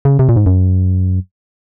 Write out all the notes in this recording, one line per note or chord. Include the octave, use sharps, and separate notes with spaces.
C#3
C3
A#2
G#2
F#2